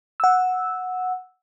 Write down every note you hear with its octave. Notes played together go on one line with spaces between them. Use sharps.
F#5 E6